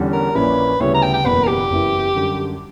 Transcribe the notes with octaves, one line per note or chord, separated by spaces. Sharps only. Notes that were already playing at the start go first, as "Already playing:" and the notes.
Already playing: E2 D3 G3 C#4
A#4
A#1 A#2 A#3 C#4 E4 B4
D2 C#3 G3 B3 E4 C#5
A#5
G5
G5
F#1 E2 B2 A#3 B4
A#4
G4
F#1 F#2 E3 B3 E4
F#2 D3 G3